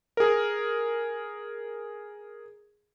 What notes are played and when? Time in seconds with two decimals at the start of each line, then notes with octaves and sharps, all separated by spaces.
0.17 G#4 A#4